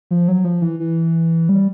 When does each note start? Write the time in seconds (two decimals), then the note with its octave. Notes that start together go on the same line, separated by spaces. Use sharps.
0.11 F3
0.28 F#3
0.44 F3
0.62 E3
0.80 E3
1.49 G3